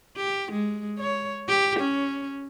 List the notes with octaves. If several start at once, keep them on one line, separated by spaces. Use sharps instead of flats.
G4
G#3
C#5
G4
C#4